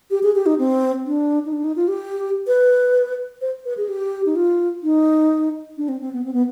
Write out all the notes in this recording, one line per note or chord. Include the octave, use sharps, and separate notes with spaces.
G4
G#4
G4
D#4
C4
D4
D#4
D4
D#4
F4
G4
B4
C5
B4
G#4
G4
D#4
F4
D#4
D4
C4
C4
B3
C4
B3